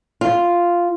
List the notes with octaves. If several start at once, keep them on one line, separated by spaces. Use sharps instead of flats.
F4